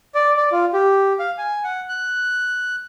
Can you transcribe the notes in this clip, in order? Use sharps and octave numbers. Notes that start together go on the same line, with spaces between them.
D5
D5
F4
G4
F5
G#5
F#5
F#6